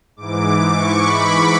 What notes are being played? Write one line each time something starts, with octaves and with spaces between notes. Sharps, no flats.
G#2 E3 D6
D6
C#6
B5